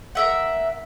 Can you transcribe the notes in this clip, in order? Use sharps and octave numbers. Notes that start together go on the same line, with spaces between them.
A#4 E5 F#5